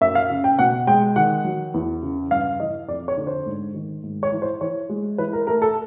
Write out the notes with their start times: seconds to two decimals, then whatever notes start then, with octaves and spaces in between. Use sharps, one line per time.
0.01 F#2 E5
0.15 F5
0.30 C#3
0.44 G5
0.59 B2 F#5
0.87 G#3 G5
1.16 D#3 F#5
1.45 F#3
1.74 E2
2.03 C#3
2.31 G2 F5
2.60 E3 D#5
2.88 F2 D5
3.08 C#5
3.17 D3
3.27 C5
3.46 G#2
3.74 D#3
4.03 G#2
4.23 C#5
4.32 E3
4.42 C5
4.61 E3 C#5
4.89 G#3
5.18 E3 B4
5.33 A#4
5.47 A3 A#4
5.62 A4